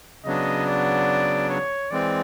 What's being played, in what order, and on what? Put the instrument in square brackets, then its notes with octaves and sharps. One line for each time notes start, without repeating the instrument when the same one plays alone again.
[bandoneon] C#3 F#3 B3 D4 [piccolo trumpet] D#5
[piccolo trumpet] D5
C#5
[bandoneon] E3 G#3 C4 [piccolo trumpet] D5